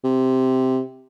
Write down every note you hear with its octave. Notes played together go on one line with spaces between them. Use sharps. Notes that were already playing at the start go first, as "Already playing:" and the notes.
C3